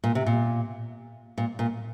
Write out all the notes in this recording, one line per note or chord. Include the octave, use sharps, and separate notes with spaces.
A#2
C3
A#2
A#2
A#2